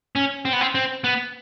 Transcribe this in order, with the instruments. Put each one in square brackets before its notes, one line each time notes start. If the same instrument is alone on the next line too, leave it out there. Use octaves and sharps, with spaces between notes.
[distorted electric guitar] C#4
C4
B3
C4
C4
B3